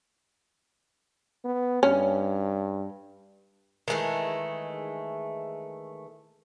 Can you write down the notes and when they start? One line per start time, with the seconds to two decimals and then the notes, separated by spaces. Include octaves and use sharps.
1.45 B3
1.83 G2 C#4
3.88 D#3 E3 G#3 A3